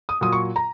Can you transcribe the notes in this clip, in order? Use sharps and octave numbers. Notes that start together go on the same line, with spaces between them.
D#6
A#2 F#3 D#6
C#6
A#5